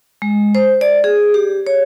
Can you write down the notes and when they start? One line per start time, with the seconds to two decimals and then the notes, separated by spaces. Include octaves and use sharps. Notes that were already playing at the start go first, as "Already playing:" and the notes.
0.22 G#3
0.55 C5
0.81 D5
1.04 G#4
1.34 G4
1.67 C#5